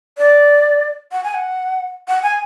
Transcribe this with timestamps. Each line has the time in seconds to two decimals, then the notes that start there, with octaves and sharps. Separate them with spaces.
0.18 D5
1.12 F#5
1.24 G#5
1.34 F#5
2.08 F#5
2.23 G#5